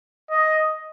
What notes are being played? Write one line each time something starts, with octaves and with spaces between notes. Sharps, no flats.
D#5